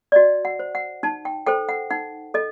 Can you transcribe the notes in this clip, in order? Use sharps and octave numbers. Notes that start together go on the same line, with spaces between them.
D5
F#4 D#5
F#5
C5
F#5
D#4 A5
G5
A4 C5 G5
F#5
D#4 F#5
A4 D#5